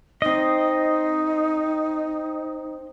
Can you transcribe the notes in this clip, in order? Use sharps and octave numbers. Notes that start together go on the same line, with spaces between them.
C4 D#4 D#5